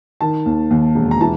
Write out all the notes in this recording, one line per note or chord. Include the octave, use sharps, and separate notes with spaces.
D#3 A5
D#2
D#2
E1
A#5
E3 A5